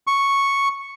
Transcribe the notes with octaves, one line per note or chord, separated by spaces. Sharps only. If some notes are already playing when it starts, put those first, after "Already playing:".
C#6